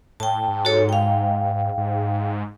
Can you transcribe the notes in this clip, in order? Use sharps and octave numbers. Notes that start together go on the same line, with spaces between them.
A2 G5 A5
G#2
F#4 A4 C#5
F5 G5
G#2